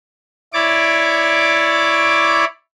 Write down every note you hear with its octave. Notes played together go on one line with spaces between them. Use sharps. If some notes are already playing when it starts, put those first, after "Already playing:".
E4 C#5 D5 D6